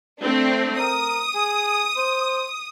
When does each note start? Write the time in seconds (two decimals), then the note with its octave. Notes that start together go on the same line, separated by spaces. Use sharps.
0.20 A3 C4 D4
0.79 A#4 D#6
1.34 G#4
1.97 C5